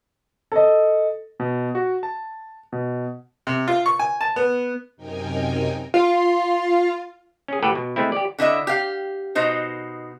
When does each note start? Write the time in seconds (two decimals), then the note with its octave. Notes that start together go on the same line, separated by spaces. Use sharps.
0.52 A4 D#5
1.40 B2
1.75 F#4
2.03 A5
2.72 B2
3.47 C3
3.68 F4
3.86 C#6
3.99 G#5
4.21 A5
4.36 B3
4.96 F#2 C3 D#4 A#4 G5 G#5
5.94 F4
7.48 C#4 G#4
7.62 A2 G4 A4 B4 F#5 G5
7.75 B2
7.96 G#3 A3 C4 E4
8.12 G4 D5
8.39 D3 E4 D#5 E5
8.67 G4 F5
9.35 B2 D#4 C5